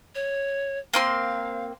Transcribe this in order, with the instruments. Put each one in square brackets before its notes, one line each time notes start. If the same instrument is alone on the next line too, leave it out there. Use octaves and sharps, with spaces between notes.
[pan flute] C#5
[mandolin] A#3 C4 C6 [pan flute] F5